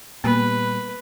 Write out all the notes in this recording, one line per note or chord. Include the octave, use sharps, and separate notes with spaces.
A#2 G3 A#3 B3 B4